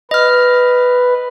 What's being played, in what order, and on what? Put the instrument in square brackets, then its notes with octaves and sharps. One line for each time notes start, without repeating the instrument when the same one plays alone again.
[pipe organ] B4 [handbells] D#5 F6